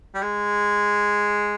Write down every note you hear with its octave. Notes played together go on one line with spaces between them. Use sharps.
G3
G#3